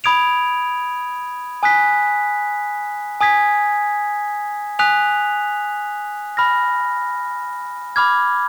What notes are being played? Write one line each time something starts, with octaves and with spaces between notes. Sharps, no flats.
B5 D#6 G#6 D7 F7
G#5 D#6 F#6 B6
G#5 D#6 G#6 B6
G#5 D#6 F#6 B6 F7
B5 F6 A#6
B5 D6 F6 G#6